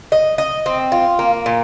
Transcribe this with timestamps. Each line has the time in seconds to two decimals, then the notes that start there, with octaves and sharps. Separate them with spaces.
0.12 D#5
0.38 D#5
0.66 C4
0.92 F4
1.19 A#3
1.46 A#2